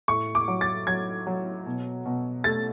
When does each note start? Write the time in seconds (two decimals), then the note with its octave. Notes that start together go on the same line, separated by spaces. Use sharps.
0.08 A2 C#6
0.35 D6
0.48 F#3
0.61 A6
0.87 F#3 G#6
1.27 F#3
1.66 B2
2.06 B2
2.44 A3 A6